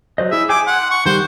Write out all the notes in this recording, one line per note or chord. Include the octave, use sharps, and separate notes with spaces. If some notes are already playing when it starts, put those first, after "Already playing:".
F#3 C5 D#5
E4 G#4 E5
G#4 G5 G#5 D6
F#5 C6
C#6
D#3 G3 C5 F#5